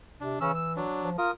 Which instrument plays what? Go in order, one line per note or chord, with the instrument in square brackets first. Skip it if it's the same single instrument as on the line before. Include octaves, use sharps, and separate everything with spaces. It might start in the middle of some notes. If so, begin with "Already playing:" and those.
[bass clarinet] C3 [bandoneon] D4
[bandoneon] C#3 C#4 E6 [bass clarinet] E3
[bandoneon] E6
F#3 D4
[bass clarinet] F3
[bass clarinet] F4 [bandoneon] A#4 D#6